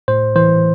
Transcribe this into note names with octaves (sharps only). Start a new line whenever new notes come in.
A2 C5
E3 C5